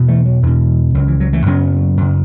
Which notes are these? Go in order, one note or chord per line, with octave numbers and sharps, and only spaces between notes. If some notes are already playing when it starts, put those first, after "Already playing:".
Already playing: E2 B2
E3 A3
F#3
E2 B2 E3
C#2 C#3 F#3
E3
F#3
E3 A3
F#2 C#3 F#3 B3
F#2 C#3